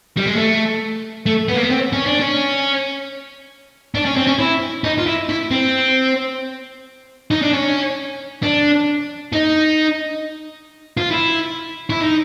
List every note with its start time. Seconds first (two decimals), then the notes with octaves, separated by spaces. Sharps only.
0.17 G3
0.26 G#3
0.36 A3
1.26 A3
1.48 B3
1.55 A#3
1.63 B3
1.70 C4
1.93 C#4
2.06 D4
2.20 C#4
3.95 D4
4.05 C#4
4.16 C4
4.27 C#4
4.39 E4
4.84 D#4
4.98 F4
5.06 E4
5.29 E4
5.51 C4
7.31 D#4
7.42 D4
7.53 C#4
8.43 D4
9.32 D#4
10.97 F4
11.11 E4
11.90 E4
12.01 D#4